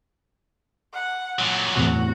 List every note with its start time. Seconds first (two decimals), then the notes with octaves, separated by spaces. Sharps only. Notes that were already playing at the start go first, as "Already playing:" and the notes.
0.94 F#5
1.39 A#2 F#3
1.73 E2 A2 C3 F#4